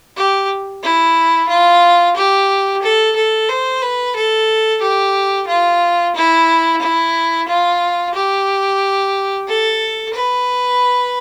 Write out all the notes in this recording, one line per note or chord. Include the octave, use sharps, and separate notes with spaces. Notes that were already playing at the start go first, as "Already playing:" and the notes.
G4
E4
F4
G4
A4
A4
C5
B4
A4
G4
F4
E4
E4
F4
G4
A4
B4